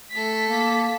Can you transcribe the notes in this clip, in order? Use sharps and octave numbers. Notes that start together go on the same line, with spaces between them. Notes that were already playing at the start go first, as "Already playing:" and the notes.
A3 A4 B6
A#3